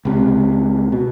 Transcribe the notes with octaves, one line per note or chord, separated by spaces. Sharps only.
C#2 C3
B2